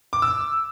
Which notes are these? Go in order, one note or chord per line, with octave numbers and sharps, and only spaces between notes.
D6
E6